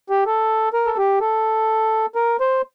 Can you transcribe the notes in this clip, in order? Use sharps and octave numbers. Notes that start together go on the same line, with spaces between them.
G4
A4
A#4
A4
G4
A4
A#4
C5